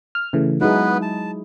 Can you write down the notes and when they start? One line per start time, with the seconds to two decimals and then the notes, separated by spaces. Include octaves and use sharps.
0.15 F6
0.33 C#3 E3 A3
0.61 F#3 G#3 B3 D#4 E4 G#4 B4
1.02 A5